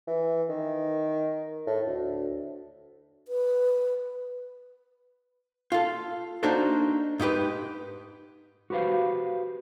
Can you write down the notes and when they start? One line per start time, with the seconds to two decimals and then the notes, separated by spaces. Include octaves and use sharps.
0.08 E3
0.49 D#3
1.67 A2
1.87 D2
3.28 B4
5.72 F4 A4
6.43 A#3 D4 D#4 F#4 A4 C5
7.20 G#2 D#4 G4 B4
8.70 F#4 G4 B4 C5 F5